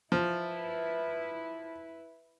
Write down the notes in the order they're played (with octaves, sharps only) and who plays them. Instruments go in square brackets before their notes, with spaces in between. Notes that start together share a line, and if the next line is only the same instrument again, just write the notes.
[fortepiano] F3 [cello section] E4 B4